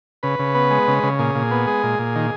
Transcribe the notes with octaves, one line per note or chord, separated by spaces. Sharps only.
C#3 B4
C#3
B3
G#3
C#3
C#3
A#2 G#4
A#2
B3
G#3
A#2
A#2
D#3